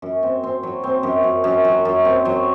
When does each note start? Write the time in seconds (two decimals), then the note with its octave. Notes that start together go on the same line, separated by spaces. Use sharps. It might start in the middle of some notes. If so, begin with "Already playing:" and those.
0.02 F#2
0.23 C4
0.43 C4
0.63 F#3
0.84 C4
1.03 F#2
1.24 F#2
1.44 F#2
1.65 F#3
1.85 F#2
2.05 C4
2.25 F#3